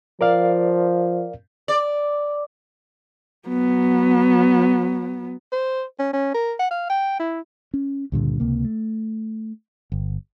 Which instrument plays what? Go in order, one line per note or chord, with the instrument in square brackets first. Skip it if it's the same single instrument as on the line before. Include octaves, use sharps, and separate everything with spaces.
[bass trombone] F3 [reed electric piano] A#4 D5 F5
[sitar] D5
[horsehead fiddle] F#3 B3
[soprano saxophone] C5
C#4
C#4
A#4
F#5
F5
G5
E4
[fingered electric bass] C#4
C#2 G2 A#2 D3
C#2 C3 A#3
A3
G1